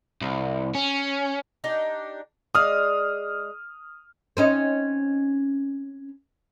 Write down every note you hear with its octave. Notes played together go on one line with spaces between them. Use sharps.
C2
C#4
D4 D#4 G4
G#3 D5 F5 D#6 F6
C4 C#4 D#4